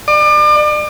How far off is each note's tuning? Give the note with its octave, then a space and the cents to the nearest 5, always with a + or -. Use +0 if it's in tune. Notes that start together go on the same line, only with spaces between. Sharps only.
D5 +35